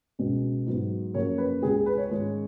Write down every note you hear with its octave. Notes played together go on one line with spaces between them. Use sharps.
C#2 B2 G#3 C#4
G#2 F#3 B3
F#2 C#3 F3 A#3 C#5
B4
C#2 C#3 G#3 G#4
G#4
B4
C#5
G#2 D#3 G#3 C#4